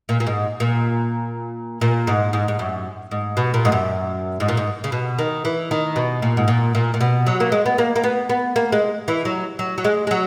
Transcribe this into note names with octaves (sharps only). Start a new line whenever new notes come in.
A#2
A#2
G#2
A#2
A#2
G#2
G#2
G#2
F#2
G#2
B2
A#2
G#2
F#2
G#2
A#2
G#2
C#3
B2
D#3
E3
D#3
B2
A#2
G#2
A#2
A#2
A#2
B2
F#3
A#3
G#3
B3
A#3
A#3
B3
B3
A#3
G#3
E3
F#3
F#3
F#3
G#3
G#3
F#3